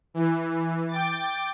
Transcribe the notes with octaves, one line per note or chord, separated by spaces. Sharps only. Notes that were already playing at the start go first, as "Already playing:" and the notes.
E3
G5 D6 A6